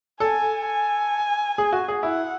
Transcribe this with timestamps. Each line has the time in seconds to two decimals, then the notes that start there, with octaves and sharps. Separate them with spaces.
0.20 A4 G#5
0.66 G#5
1.58 G#4
1.73 F#4
1.88 G#4
2.03 E4 F#5